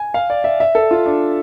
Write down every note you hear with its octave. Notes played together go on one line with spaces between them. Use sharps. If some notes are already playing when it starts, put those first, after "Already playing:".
Already playing: G#5
F5
D5
E5
E5
A4
F4
D4